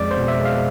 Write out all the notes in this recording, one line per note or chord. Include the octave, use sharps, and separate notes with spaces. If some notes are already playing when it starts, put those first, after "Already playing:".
Already playing: F2 G#3 D5
C5
B2
E5
G#3
F5